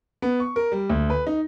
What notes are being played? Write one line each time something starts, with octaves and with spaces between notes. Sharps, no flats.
B3
C#6
A#4
G3
D2
B4
D#4